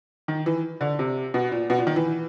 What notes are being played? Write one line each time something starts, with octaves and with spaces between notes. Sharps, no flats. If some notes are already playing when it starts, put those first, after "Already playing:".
D#3
E3
D3
C3
B2
A#2
B2
A#2
D#3
E3